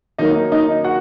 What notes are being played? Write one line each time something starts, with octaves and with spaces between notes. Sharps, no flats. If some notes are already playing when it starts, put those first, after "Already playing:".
D#3 F#3 A#3 D#4 D#5
D#4 D#5
F#4 F#5